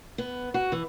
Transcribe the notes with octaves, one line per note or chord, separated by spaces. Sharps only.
B3
F#4
E3